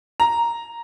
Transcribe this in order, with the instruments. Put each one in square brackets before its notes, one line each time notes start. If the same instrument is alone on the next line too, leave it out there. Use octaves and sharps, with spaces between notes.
[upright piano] A#5